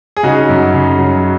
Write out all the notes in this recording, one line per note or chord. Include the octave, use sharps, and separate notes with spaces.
G#4
C#3 D#4 F#4
F#2
C#3
F#3